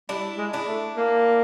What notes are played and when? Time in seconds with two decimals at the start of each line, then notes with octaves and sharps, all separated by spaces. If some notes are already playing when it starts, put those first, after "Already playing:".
0.09 G3 D4 E4
0.38 G#3
0.53 D4 E4
0.68 A3
0.97 A#3